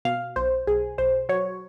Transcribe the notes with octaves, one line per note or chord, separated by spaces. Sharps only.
B2 F5
B1 C5
B1 G#4
B1 C5
F#3 C#5